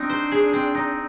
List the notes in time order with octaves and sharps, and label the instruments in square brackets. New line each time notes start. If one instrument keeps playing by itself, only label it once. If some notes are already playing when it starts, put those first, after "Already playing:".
Already playing: [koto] C4 D#4 [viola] D4
[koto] C5
G#4
C4
D#4